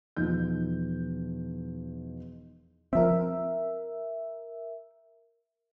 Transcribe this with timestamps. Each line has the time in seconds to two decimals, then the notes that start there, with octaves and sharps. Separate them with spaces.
0.16 E1 F3 D#4 G6
2.93 F3 C4 A#4 E5